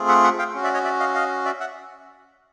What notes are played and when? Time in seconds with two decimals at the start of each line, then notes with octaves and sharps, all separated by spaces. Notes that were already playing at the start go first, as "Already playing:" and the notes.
Already playing: A3 C4 F4 G#4
0.08 E5 F#5
0.23 E5 F#5
0.39 F5 G5
0.54 C#4 F#4
0.64 D5 E5
0.74 C#5 D#5
0.84 D5 E5
0.99 D#5 F5
1.14 D#5 F5
1.45 D5 E5
1.60 E5 F#5